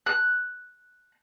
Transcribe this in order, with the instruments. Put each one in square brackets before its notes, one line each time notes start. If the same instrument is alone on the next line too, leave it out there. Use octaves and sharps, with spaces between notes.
[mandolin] F#6